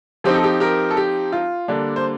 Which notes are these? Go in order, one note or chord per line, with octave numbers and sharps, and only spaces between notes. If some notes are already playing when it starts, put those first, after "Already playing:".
F3 C4 D#4 G4
A4
G4
G4 A#4
A4
G4
F4
D3 G3 A#3 D4
C5